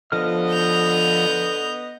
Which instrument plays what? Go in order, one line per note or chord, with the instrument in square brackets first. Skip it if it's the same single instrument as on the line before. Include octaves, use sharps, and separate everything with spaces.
[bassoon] D3 [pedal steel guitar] F3 F6 [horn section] B3 D#5
[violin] G6 F7